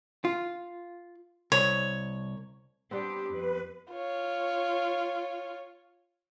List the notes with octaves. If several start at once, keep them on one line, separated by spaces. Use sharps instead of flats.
F4
C2 C#5
G3 B3 C4 D4 G4
F2 B4
F4 C#5